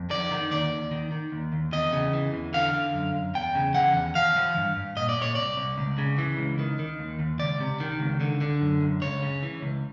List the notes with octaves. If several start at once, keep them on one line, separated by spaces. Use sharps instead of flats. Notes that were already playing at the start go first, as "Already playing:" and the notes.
Already playing: F2
D#3 D5
D#3
D#2 D5
D#2
D#3
D#3
D#2
D#2
E2 D#5
C#3
E3
E2
D3 F5
D3
F#2
F#2
E2 G5
C#3
E3 F#5
E2
E3 F5
E3
G2
G2
A#2 D#5
D5
A#2 C#5
C2 D5
C2
C#2
C#3
E3
C#2
D#3
D#3
D#2
D#2
C#2 D5
C3
D#3
C#2
D3
D3
F#2
F#2
C#2 C#5
C#3
E3
C#2